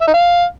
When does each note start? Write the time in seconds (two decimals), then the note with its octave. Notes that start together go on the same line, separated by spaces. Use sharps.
0.01 E5
0.08 D#4
0.14 F5